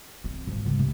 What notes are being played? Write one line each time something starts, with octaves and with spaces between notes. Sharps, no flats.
C4
G#2 D#3
C#3 G3
C3 D4